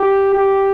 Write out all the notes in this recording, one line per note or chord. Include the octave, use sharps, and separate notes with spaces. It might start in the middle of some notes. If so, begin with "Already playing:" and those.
Already playing: G4
G4